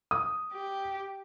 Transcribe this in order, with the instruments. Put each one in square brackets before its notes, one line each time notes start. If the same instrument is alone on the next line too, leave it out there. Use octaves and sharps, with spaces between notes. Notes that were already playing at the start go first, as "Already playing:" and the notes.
[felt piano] D#6
[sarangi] G4